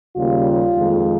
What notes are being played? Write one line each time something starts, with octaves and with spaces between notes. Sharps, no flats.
D#2 C#3 G3 A#3 F4
F2 D#3 G#3